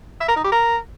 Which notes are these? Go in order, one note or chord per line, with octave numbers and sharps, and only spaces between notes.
E5
A#4
D#4
G4
A#4